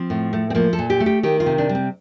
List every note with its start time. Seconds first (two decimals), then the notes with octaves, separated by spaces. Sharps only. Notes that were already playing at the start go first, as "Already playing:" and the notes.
Already playing: F3 C4
0.10 A2
0.33 A3
0.50 C4
0.55 F3 A#3
0.73 A4
0.79 A#2
0.90 G4
1.00 A3
1.06 G4
1.23 D#3 G4
1.40 F4
1.46 C3
1.58 D4
1.69 G3
1.75 C4